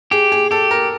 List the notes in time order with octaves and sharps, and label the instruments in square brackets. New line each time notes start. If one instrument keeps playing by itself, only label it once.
[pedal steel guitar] G4 [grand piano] G#4
[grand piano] G#4
[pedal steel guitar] G4 [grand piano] A4
[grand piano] A#4